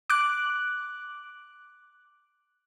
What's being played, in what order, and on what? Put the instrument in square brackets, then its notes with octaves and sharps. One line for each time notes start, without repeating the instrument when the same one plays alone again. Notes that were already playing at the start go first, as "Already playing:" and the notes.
[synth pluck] D6 F#6